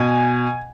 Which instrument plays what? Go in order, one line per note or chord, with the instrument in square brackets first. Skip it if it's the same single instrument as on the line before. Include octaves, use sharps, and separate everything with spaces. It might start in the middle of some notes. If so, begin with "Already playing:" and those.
Already playing: [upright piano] B2 G#5